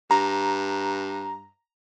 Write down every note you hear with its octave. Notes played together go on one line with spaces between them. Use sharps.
G2 A#5